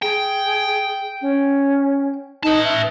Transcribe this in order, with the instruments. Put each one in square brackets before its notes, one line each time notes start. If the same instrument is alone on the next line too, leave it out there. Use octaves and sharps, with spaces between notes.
[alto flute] G#4 [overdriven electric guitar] G5
[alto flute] C#4
[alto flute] D#4 [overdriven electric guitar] B4 A5
[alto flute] E5